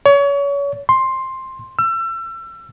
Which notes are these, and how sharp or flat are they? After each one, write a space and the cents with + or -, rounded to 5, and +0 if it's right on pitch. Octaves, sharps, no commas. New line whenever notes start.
C#5 +30
C6 +10
E6 +35